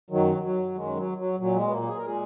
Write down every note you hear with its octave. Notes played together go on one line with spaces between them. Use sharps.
F#2 D#3 F#3
F#3
F#2 D#3 G#3
F#3
F#3
A#2 F#3
G#3
B3
A#2 A#3
G#4
A#4
A#2 G#3 G#4